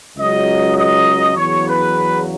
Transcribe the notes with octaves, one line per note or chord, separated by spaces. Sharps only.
C#2 C#3 F#3 D#5
D#5
E2 C#3 F#3 C#5
B4